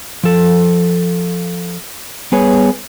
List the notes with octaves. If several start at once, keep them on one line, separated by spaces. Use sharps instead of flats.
F3 A4
G3 B3 G#4 B4 C#5